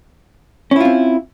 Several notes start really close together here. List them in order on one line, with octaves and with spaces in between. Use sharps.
C#4 E4 F4 C4